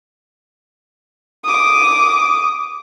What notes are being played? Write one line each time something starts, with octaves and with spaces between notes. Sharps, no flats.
D6 D#6